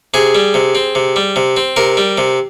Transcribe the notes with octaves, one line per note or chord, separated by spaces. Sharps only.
C3 G#4
G3
C3
C4
C3
G3
C3
C4
C3 A#4
G3
C3